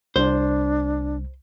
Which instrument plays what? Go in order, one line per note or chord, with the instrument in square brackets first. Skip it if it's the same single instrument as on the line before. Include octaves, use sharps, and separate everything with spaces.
[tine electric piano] C2 [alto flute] D4 [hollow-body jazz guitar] C5